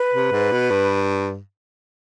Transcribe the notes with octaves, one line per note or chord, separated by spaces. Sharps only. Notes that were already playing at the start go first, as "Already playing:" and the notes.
Already playing: B4
C3
G#2
B2
G2